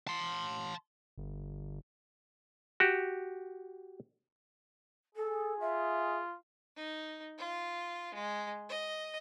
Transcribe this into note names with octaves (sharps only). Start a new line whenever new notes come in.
A5 C6
G1
F#4 G4
G#4 A4
F4 E5
D#4
F4
G#3
D#5